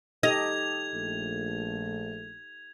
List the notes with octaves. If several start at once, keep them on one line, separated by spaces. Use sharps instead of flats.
D#4 G4 A4 D#5 G#6 F7
A#1 A3